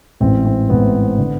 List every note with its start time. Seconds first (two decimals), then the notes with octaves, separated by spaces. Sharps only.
0.20 A1 G#2 E3 C4
0.45 C4
0.69 A1 G#2 E3 B3
1.18 D3